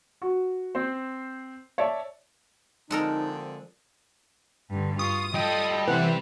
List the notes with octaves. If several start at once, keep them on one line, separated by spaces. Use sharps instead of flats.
F#4
C4 C5
C#5 D5 E5 A5
D3 F3 G#3 C4 D#4 A4 A#4
G2 D3
F4 C#6 D#6
G3 F4 A4 D#5 G5
C3 E3 C5 F#5